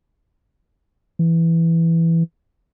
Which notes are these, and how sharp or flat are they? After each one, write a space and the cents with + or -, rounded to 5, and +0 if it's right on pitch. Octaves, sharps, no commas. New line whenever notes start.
E3 +5